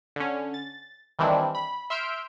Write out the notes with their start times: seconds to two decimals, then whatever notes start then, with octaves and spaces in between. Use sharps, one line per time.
0.16 D3 C#4
0.54 A6
1.19 D#3 E3 G3 C4 D4 E4
1.55 B5
1.90 E5 C6 E6 F6 G6 D7